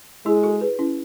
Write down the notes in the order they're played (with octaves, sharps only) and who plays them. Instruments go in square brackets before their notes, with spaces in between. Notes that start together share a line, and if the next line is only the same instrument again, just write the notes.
[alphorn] G#3 [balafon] E4 G#4
[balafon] F#4 A4
G#4 B4
C#4 E4